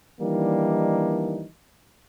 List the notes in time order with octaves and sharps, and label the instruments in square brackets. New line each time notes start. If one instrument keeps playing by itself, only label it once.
[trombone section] D#3 E3 G3 A#3 D4 D#4